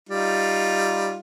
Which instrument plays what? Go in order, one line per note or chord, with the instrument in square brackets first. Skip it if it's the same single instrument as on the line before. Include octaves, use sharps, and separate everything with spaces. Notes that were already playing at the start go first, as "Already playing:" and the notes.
[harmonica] G3 D#4 F4